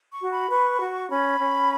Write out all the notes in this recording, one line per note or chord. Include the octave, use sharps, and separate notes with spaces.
C#6
F#4
B5
B4 C#6
F#4
C#4 B5
C#4